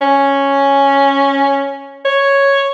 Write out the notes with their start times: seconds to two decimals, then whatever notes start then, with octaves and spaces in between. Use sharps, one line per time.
0.02 C#4
2.05 C#5